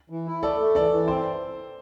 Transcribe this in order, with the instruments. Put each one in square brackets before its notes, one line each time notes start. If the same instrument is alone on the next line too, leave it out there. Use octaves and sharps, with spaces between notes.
[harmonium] E3
E4
[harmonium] A3 [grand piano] A4 D5
[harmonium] A3
[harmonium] E3 [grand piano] A4 D5
[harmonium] E3
[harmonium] C4 [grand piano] C5